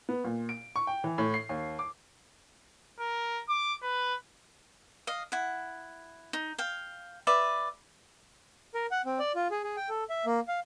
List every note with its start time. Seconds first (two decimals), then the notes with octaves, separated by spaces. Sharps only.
0.09 B3
0.24 A#2
0.49 D7
0.76 C#6
0.87 G5
1.04 E3
1.18 A2
1.34 C7
1.49 D#2
1.79 D6
3.00 A#4
3.49 D6
3.83 B4
5.07 D#5 F5
5.32 E4 F#5
6.33 D#4
6.58 F5 G5
7.27 B4 D5 E5
8.74 A#4
8.91 F#5
9.05 C4
9.19 D5
9.35 F4
9.51 G#4
9.64 G#4
9.76 G5
9.89 A4
10.10 E5
10.26 A#3
10.48 F5